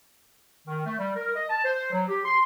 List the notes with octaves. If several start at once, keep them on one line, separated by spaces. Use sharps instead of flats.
D#3
A3
G3
A#4
D#5
A5
C5
F#3
G4
C6